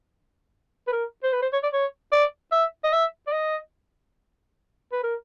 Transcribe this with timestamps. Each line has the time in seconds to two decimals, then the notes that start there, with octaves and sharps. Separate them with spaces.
0.87 B4
0.92 A#4
1.23 C5
1.33 B4
1.42 C5
1.53 C#5
1.63 D5
1.73 C#5
2.12 D5
2.52 E5
2.84 D#5
2.93 E5
3.27 D5
3.32 D#5
4.92 B4
5.03 A#4